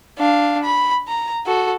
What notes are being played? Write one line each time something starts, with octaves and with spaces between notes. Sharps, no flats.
D4 F5
B5
A#5
F#4 A4